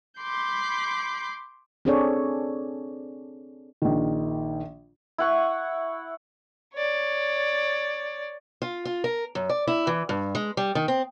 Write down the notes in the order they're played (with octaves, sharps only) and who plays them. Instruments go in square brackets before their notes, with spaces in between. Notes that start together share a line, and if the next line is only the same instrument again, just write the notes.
[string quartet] B5 C6 D6 G6
[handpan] C4 D4 G#4 A4 C#5 D5
[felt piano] A#1 D#3
[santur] E4 F#5 C#6
[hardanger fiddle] C#5 D5
[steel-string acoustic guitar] F4
F4
A#4
F#2
D5
E4
E3
G2
G#3
G3
D#3
C4